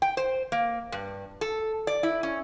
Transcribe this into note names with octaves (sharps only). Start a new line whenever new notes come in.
G5
C5
A#3
G2
A4
D5
E4
C#4